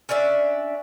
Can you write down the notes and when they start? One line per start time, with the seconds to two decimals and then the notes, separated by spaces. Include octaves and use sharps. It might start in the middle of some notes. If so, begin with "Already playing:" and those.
0.09 C#4 D4 D5 E5